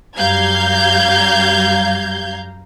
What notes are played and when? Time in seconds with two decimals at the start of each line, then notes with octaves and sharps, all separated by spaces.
0.17 F#2 G3 F5 A#5 G6 G#6